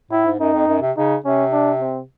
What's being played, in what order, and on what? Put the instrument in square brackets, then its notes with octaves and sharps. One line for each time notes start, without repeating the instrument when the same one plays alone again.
[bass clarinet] A2 [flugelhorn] E4
[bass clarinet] G#2
[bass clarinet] F#2 [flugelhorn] D#4
[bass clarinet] F2
F#2
C3
[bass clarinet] C#3 [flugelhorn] D#4
[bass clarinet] C3 [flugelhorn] C#4
[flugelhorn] D4
C4